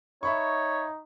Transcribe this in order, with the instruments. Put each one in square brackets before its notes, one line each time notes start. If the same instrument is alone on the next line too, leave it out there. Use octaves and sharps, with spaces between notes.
[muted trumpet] D#4 [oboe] C#5 [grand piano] E5 B5 C#6